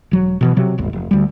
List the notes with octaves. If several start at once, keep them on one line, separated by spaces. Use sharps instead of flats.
E1 F#3
B2 D#3 E3
C3 F#3
D#1 G#1 D#2
F1
D2 G3